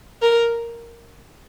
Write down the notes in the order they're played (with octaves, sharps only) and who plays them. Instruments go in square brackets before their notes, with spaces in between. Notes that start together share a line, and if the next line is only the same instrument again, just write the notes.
[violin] A#4